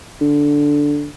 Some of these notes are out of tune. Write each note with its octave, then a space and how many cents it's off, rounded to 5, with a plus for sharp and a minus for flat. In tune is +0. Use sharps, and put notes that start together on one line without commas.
D3 -5